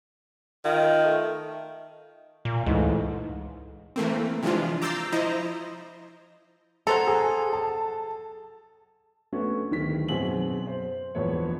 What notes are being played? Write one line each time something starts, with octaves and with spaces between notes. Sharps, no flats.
D#3 F4
A3
A#2
C#2 G#2 E3 A3
E3 A3 A#3 C4
C3 E3 F3 G#3 D4 F4
A#5 D6 E6 G6 A6 C7
F3 E4 C5 D#5 A#5
F#3 A4 C5 A#5
G#4
A5
A3 B3 C#4 D4 F#4
D1 D#3 B6
F#2 B2 C4 G#4 F#7
C5
E1 A#1 E2 B3 C#5